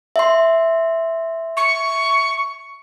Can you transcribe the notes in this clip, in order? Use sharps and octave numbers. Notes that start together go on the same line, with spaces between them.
E5 C6
C#6